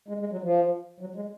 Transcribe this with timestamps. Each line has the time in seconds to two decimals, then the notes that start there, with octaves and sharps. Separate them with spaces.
0.08 G#3
0.20 G#3
0.32 F#3
0.43 F3
1.00 F#3
1.16 G#3